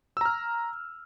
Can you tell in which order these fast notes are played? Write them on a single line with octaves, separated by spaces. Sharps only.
E6 A#5 F6